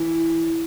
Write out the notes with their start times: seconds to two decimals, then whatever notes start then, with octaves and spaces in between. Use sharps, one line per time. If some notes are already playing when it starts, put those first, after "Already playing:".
Already playing: E3